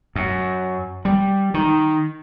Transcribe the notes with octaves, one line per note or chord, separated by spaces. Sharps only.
F#2
G3
D#3